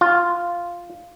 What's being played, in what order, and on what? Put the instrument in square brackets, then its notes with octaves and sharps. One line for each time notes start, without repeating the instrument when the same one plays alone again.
[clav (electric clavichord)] F4